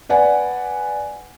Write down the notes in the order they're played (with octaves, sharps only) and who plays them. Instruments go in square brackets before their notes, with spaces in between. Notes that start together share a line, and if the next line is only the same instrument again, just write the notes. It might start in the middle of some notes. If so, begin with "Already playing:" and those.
[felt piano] B4 D5 F#5 G#5